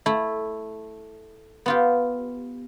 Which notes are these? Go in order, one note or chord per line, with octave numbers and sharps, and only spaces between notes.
A3 E4
B3 F4 G4